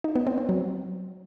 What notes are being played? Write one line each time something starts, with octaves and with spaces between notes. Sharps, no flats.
D#4
B3
C4
C4
F#3